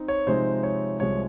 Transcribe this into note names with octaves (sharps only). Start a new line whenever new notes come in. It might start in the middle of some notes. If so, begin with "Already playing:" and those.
Already playing: C4 D#4
C#5
C3 F3 G#3 C4 D#4 C5
C#5
C2 C3 F3 G#3 C#5